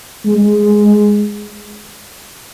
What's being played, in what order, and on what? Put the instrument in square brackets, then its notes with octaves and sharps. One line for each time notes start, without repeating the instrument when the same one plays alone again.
[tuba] G#3